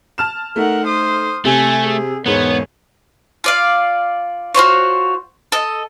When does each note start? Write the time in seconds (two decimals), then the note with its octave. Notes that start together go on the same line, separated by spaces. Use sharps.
0.18 A5 F6 E7
0.56 A3 D#4 A#4 F#5
0.85 C5 D#6
1.45 C3 A3 G#5
1.84 G#4
2.26 E1 G#2 B3 C#5
3.44 F4 D5 F5
4.54 F4 F#4 C5 C#5
5.52 A4 D#5